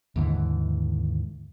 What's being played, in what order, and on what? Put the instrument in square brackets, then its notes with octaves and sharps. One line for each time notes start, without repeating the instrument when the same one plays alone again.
[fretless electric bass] D#2 G#2 D3 E3